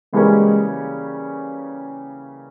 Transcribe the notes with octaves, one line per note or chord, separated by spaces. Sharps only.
C#3 E3 G3 G#3 A#3 C#4